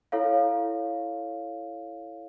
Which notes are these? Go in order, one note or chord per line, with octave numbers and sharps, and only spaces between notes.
E4 A4 C#5 F5